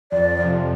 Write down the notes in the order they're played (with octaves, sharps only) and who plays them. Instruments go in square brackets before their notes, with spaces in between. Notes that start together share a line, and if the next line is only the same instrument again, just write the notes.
[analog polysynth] F2 [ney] D5
[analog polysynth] C3 F3